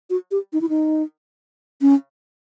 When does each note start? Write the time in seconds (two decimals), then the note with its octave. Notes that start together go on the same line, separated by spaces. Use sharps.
0.10 F#4
0.31 G4
0.53 D#4
0.61 E4
0.69 D#4
1.81 C#4